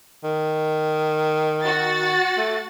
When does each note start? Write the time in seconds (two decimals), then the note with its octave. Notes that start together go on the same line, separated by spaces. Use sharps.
0.24 D#3
1.60 F#4 A6
2.37 A3